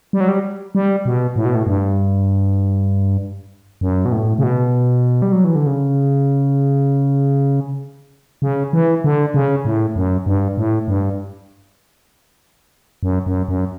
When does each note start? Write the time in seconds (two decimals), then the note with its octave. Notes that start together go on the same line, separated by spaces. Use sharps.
0.13 G3
0.20 F#3
0.28 G3
0.75 G3
1.06 B2
1.36 A2
1.45 B2
1.55 A2
1.67 G2
3.81 F#2
4.05 B2
4.12 A2
4.39 C#3
4.44 B2
5.22 G3
5.32 F#3
5.44 E3
5.55 D3
5.67 C#3
8.42 C#3
8.73 E3
9.04 D3
9.34 C#3
9.65 A2
9.96 F#2
10.26 G2
10.57 A2
10.88 G2
13.03 F#2
13.26 F#2
13.48 F#2